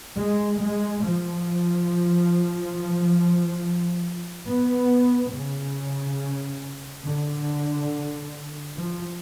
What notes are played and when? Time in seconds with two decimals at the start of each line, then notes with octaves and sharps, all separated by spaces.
0.17 G#3
0.59 G#3
1.03 F3
4.47 B3
5.32 C#3
7.05 D3
8.77 F3